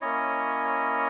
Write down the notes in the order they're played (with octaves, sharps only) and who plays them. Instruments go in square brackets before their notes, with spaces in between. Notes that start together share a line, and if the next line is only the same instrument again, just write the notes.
[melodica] A#3 C#4 E4 C#5 D#5